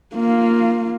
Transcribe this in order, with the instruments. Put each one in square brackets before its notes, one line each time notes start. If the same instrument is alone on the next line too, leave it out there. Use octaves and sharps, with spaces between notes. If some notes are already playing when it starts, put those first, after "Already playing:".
[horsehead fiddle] A#3 F4